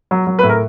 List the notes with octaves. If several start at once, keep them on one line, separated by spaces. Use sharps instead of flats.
F#3
F#3
B4
A2
A#4